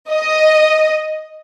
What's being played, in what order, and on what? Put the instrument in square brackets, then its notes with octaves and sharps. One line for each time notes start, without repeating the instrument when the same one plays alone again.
[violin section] D#5